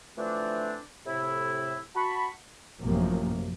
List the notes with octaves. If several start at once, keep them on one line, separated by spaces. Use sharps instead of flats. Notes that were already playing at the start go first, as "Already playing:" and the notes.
D3 E3 F3 A3 C4 D4
A2 C3 E4
F#4 A5 B5 C#6
A1 F#2 C3 F3 A#3